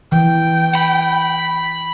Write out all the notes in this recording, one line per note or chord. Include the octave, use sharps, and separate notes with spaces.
E3 G5
B5